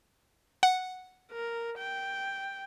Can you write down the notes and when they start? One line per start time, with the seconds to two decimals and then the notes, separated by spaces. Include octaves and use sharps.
0.63 F#5
1.32 A#4
1.78 G5